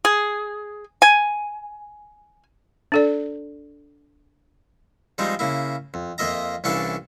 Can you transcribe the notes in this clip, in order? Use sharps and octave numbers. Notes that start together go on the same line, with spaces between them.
G#4
G#5
D4 A4 D5
F3 G3 G#3 C4 D#4
C#3 A#3 E4
F2
F2 A#3 F4 D#5 E5 A#5
C2 E3 C#4 D4 A4 F5